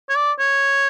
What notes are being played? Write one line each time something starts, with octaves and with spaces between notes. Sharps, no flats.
C#5
D5
C#5